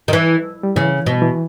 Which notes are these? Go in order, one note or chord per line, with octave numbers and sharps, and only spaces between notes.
D#3
E3
G3
C#3 E3
B2
E3